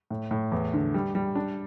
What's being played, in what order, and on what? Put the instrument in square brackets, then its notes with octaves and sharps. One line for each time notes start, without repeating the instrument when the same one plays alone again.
[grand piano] A2
A2
E2
D3
G3
G3
D4